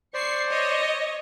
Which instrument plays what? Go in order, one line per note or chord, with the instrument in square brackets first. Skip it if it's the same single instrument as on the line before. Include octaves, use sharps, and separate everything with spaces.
[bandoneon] C5 D5 [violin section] C#6 C7
[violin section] C#5 D#5